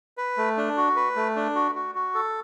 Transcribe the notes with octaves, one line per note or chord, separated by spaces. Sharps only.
B4
A3
D4
F#4
B4
A3
D4
F#4
F#4
F#4
A4